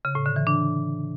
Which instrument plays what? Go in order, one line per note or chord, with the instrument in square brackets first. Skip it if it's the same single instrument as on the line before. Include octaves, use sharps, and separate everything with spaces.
[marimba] C#3
A2
D3
E3
D4